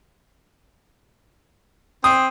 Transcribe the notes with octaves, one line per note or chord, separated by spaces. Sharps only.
C4 D#6